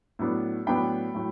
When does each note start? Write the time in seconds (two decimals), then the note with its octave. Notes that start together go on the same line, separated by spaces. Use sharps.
0.19 A2 F#3 B3 D4
0.67 A2 F#3 B3 D4 G5 B5
1.15 A2 F#3